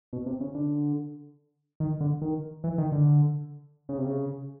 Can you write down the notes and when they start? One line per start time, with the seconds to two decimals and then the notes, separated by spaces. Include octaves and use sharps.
0.13 B2
0.26 C3
0.41 C#3
0.55 D3
1.80 D#3
2.01 D3
2.22 D#3
2.64 E3
2.78 D#3
2.92 D3
3.89 C#3
3.98 C3
4.06 C#3